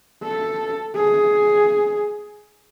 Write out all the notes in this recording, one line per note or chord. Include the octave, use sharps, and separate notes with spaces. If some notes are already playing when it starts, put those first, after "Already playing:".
A4
G#4